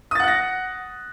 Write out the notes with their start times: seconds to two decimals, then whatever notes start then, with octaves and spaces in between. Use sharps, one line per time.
0.11 D#6
0.15 A6
0.19 F#5
0.24 F#6
0.28 A#6